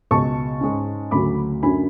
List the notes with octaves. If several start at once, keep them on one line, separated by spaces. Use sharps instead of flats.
C#2 B2 G#3 A5 C#6
G#2 G#3 C#4
D2 C#3 F#3 B5 D6
F#2 D3 F#3 C#4 G#5 B5